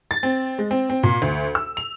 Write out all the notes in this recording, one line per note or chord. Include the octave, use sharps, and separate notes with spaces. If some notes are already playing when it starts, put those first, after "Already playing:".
A6
C4
G#3
C4
C4
A#2
D2
E6
F7